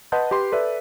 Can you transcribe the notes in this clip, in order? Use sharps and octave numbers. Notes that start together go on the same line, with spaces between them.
B4 D#5 F#5 A5 C6 G6
G4 B4 C6
A4 B4 D5 E5